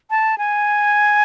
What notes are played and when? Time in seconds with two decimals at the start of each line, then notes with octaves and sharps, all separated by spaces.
0.10 A5
0.38 G#5